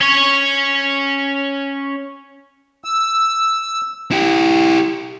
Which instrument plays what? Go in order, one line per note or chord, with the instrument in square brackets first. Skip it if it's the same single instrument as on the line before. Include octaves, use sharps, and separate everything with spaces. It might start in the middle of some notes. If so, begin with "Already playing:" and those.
[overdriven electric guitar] C#4 C#5
[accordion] E6
[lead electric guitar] E4 G4